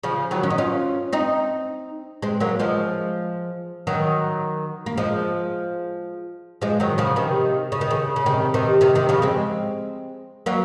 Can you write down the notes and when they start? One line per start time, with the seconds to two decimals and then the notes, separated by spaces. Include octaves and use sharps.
0.03 C#3 F3
0.31 D#3 F#3
0.43 C#4
0.50 D#4
0.58 C#4 F4
1.13 C4 D#4
2.22 G#3 C4
2.40 F#3 A#3
2.60 F3 G#3
3.87 D#3 F#3
4.86 A#3
4.98 F3 G#3
6.61 F3 G#3
6.80 D#3 F#3
6.98 C#3 F3
7.16 C3 D#3
7.72 C#3
7.81 D#3
7.91 C#3
8.16 C#3
8.26 C3 D#3
8.54 C3 D#3
8.81 C3 D#3
8.95 C3 D#3
9.09 C#3 F3
9.22 G#3 C4
10.46 F#3 A#3